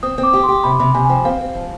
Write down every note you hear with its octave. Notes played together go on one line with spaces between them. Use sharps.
C4 D#6
C4
D6
G4
C6
G4
C3 B5
C3 B5
C3 G#5
G#5
F3 G5
C4 F5
C4
F3